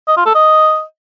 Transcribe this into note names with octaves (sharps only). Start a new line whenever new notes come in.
D#5
F4
A4
D#5